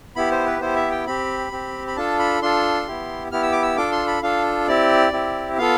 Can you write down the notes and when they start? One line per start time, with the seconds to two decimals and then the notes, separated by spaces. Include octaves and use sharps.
0.16 B3 E4 G4 B5
0.31 C5
0.46 B4
0.60 B3 E4 G4 C5
0.76 E5
0.91 G5
1.06 C4 G4 B5
1.52 C4 G4
1.87 B5
1.96 D4 F4 A4 A5
2.19 B5
2.42 D4 F4 A4 C6
2.87 B3 E4 G4
3.32 B3 E4 G4 F6
3.43 E6
3.52 D6
3.63 E6
3.77 D4 F4 A4 D6
3.92 C6
4.07 B5
4.22 D4 F4 A4 F5
4.67 C4 E4 G4 D5
5.12 C4 E4 G4
5.58 B3 F4 A4 F5